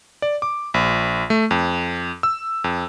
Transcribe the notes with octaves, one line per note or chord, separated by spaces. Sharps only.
D5
D6
A#1
A3
F2
E6
F2